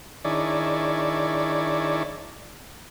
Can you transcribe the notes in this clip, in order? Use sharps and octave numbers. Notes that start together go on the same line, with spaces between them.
D#3 D4 E4 G#4 C#5 D5